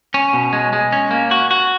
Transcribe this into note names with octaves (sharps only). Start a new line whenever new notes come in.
C#4
B2
G#3
G#3
C#4
A#3
F#4
F#4